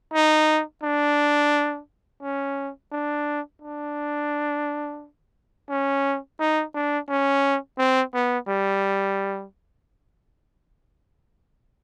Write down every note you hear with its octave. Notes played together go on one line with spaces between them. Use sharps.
D#4
D4
C#4
D4
D4
C#4
D#4
D4
C#4
C4
B3
G3